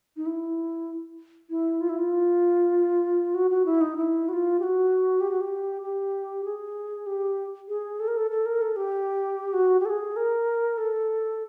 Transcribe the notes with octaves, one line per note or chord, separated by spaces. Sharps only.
D#4
E4
E4
F4
E4
F4
F#4
F#4
E4
D#4
E4
F#4
F4
G4
F#4
G4
F#4
G4
G4
G#4
G4
G#4
A4
A#4
A4
A4
A#4
A4
G4
F#4
G4
A4
G#4
A#4
A4